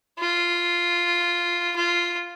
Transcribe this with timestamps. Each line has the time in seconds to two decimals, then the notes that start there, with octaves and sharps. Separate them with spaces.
0.19 F4
1.76 F4